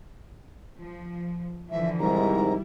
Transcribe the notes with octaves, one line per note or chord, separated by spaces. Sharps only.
F3
D3 E3 F3 E5
G#2 C3 D#3 G3 E4 A#5